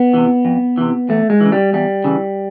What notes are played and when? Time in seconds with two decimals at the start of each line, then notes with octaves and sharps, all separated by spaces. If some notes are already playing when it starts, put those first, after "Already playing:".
Already playing: B3
0.14 C3 E3
0.45 F2
0.78 C3 E3
1.09 E2 A3
1.30 G#3
1.40 C#3 E3
1.52 G3
1.73 E2 G3
2.04 C#3 E3